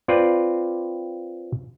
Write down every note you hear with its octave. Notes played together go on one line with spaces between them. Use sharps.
C4 F4 B4 D5